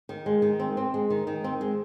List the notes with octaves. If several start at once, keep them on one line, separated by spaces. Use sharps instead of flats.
D#3
G#3
D#3
C4
C4
G#3
D#3
D#3
C4
G#3